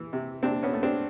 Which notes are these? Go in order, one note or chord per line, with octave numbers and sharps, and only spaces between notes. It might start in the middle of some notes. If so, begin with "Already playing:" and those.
Already playing: E3
C3
C3 C4 D4
B3 C#4
A3
C4 D4